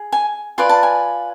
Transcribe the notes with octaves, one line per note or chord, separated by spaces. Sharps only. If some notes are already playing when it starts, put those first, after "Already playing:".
Already playing: G#4
G#5
F4 B4 D5 G#5
A5
G#5